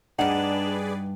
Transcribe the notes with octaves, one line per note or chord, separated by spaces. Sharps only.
G2 D4 D#4 G#4 B4 D5 F#5